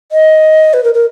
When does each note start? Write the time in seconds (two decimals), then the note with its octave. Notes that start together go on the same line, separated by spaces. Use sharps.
0.12 D#5
0.74 B4
0.84 A#4
0.94 A#4